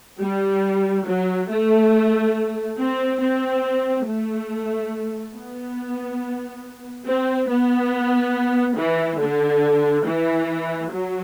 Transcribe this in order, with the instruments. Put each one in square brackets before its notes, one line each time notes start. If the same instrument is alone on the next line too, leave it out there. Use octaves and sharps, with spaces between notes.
[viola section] G3
F#3
A3
C4
C4
A3
B3
C4
B3
E3
D3
E3
F#3